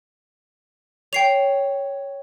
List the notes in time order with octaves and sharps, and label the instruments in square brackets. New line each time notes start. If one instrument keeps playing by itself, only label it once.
[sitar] C#5 [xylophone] G5 C7 F7